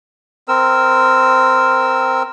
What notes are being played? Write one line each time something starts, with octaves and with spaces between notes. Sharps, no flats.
C4 A#4 E6